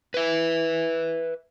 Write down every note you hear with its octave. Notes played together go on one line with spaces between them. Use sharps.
B4 E5